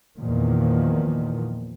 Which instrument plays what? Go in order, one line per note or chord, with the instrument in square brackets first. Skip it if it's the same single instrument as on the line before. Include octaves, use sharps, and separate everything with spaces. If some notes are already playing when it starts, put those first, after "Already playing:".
[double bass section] E2 A#2 D#3 F3